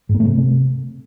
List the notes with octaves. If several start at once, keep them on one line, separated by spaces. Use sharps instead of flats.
G#2
A#3
A3
C3